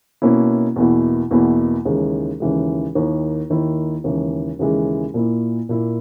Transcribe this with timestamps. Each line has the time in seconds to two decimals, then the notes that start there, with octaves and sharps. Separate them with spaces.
0.22 B2 A#3 C#4 E4
0.76 E2 B2 A#3 E4
1.31 E2 B2 A#3 E4
1.85 D#2 C#3 E3 G#3
2.40 D#2 C#3 E3 G#3
2.95 D#2 D#3 A#3 E4
3.50 D#2 D#3 A#3 E4
4.04 D#2 C#3 E3 G#3
4.59 D#2 C#3 E3 G#3
5.14 A#2 A#3 E4
5.69 A#2 A#3 E4